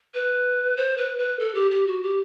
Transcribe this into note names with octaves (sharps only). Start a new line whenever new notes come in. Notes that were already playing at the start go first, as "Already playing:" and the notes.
B4
C5
B4
B4
A4
G4
G4
F#4
G4